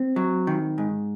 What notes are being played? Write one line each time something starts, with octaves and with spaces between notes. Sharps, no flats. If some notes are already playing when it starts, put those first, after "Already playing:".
Already playing: C4
F#3
D#3
G#2